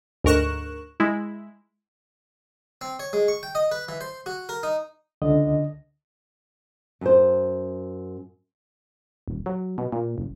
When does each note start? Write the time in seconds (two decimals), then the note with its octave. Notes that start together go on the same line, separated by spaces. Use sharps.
0.24 D2 G#2 A#4 C#6 F#6 E7
1.00 G#3 E4
2.81 C4
2.99 C#5
3.13 G#3
3.28 C#6
3.43 G5
3.55 D#5
3.71 B4
3.88 E3
4.01 C5
4.26 F#4
4.49 A#4
4.63 D#4
5.22 C#2 D3 D#5
7.01 F#2 C5
9.28 D#1
9.46 F#3
9.78 B2
9.92 A#2
10.18 F#1